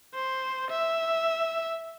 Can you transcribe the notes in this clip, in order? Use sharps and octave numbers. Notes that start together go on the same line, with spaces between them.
C5
E5